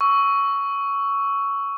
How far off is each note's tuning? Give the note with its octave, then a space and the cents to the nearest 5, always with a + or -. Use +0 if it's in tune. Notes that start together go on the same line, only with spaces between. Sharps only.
C#6 +10 E6 +0